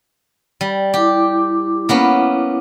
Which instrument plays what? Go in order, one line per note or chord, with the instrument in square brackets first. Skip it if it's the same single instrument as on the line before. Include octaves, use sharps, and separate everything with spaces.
[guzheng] G3
[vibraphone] E4 D6 [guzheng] G4
[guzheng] A#3 B3 C#4